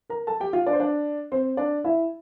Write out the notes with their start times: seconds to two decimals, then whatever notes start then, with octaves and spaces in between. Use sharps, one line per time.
0.10 A#4 A#5
0.27 A4 A5
0.40 G4 G5
0.53 F4 F5
0.67 D4 D5
0.73 C5
0.80 D4 D5
1.32 C4 C5
1.57 D4 D5
1.84 E4 E5